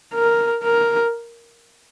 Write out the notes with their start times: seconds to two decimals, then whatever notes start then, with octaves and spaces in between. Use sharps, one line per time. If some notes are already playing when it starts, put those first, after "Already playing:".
0.14 A#4
0.64 A#4